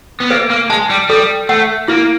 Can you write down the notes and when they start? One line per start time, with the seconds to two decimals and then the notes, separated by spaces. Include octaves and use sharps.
0.20 B3
0.30 A#3 B4
0.50 A#3
0.70 G#3 A5
0.90 G3
1.09 G3 A4
1.49 A3 F#5
1.88 A#3 E4